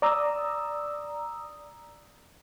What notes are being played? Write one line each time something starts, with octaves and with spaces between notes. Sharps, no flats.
D5 A#5 D#6 E6